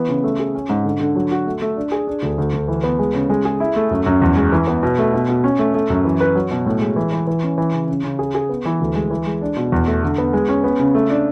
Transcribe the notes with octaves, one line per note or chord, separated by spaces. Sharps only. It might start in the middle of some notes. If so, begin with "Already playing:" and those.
Already playing: E3 B3
C#3
A3
G#4
C#4
G#2
D3
D3
F#3
F#4
A3
A3
D4
G#4
D4
D2
D2
D2
E3
B3
G#3
C#3
G#3
G#4
E4
A3
F#2
F#2
E2
G#3
E3
B3
B2
A3
B2
B2
C#4
A3
A3
F#2
E3
B4
F#3
B2
A2
G#3
E3
E3
E3
C#4
E3
C#3
C#3
C#3
G#4
G#4
B3
E3
D2
G#3
E3
G#3
D4
B2
E2
A3
D3
B3
G#3
C#4
B3
C#3
A3
D4